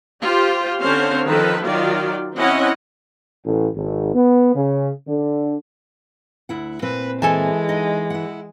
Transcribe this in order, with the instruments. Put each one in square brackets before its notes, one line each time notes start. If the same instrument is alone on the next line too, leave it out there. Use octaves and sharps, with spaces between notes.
[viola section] F4 G4 C5
D3 C4 C#4 C5 C#5 F5
D#3 F3 A4 B4
D#3 F#3 F4 D5
C4 C#4 E4 D#5 F#5
[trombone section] A1
G#1
B3
C#3
D3
[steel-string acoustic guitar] D2 E4 F#5
[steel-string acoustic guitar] A#2 C4 [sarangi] B4
[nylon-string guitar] E3 [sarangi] G#3 [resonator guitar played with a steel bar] A4 G#5 A5
[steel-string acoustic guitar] D#4 D#5 F#5
E4 F#5